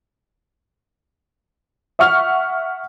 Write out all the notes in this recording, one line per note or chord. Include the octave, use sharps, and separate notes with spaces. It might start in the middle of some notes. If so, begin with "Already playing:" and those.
E5 F#5 C#6 F6